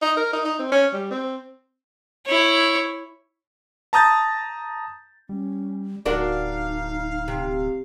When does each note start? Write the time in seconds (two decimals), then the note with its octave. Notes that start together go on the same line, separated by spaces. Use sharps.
0.02 D#4
0.17 A#4
0.33 D#4
0.45 D#4
0.59 C4
0.72 C#4
0.93 G3
1.11 C4
2.26 E4 C#5
3.93 A5 A#5 D#6 G6 A6
5.29 G3 C#4
6.06 D1 D4 D#4 F#4 A#4 F5
7.28 C3